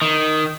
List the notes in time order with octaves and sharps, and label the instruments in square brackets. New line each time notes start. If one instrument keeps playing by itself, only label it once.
[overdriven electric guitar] D#3